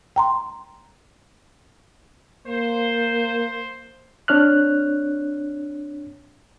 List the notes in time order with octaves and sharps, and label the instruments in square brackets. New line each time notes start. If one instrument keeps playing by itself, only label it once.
[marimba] G5 A#5 C6
[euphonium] A#3 [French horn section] C5
[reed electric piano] C4 D4 C#5 F6 F#6